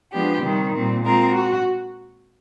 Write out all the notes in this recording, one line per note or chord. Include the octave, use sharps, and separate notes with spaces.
F3 G#3 B3 D4 G4
C3 D#3 G3 C4
A#2 G3 C4
G#3 C4 F4 A#4
F#4